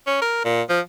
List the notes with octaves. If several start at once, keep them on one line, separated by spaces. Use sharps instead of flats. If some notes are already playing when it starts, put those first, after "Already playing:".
C#4
A#4
A#2
F3